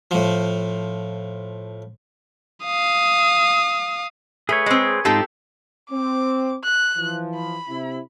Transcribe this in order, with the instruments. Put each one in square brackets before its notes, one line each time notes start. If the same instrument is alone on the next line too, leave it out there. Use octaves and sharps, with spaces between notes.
[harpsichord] A2 F3
[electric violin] F5 D#6
[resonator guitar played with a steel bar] A3 [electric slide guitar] G#4 B4 C#5
[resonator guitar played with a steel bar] G#3 C4
[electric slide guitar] G#2 D#4 F4 [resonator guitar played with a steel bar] C4 G4 A4
[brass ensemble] C4 [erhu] D6
[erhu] F#6
[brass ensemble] E3 F3
[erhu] B5
[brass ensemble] C3 E4